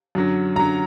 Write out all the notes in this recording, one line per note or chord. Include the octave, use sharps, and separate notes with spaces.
F#2 D3 F#3
F#2 D3 F#3 A#5